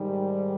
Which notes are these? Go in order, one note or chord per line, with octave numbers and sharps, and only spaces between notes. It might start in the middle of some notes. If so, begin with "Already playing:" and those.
Already playing: G#2 D#3 G3